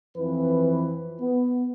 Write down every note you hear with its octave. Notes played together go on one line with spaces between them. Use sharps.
F2 E3 F3 C4 B4
B3